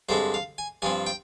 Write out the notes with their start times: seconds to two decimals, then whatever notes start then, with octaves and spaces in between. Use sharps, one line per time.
0.09 G2 D3 G#3 C4 C5
0.34 F5
0.58 G#5
0.82 G2 F3 C4 G#5
1.07 G5